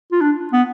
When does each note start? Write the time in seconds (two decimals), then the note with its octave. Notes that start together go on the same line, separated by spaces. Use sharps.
0.12 F4
0.21 D4
0.53 B3